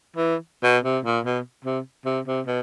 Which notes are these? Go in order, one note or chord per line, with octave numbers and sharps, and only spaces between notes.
E3
B2
C3
A#2
B2
C3
C3
C3
B2